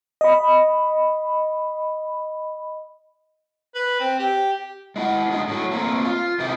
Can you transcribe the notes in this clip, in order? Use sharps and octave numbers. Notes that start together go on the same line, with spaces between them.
D#5 B5
B4
C4
G4
G#3 E4 F#5
G#3 D4 D#4
A2 F#3
A3 A#3 C4
F4
A2 C3 D#3 E4 G4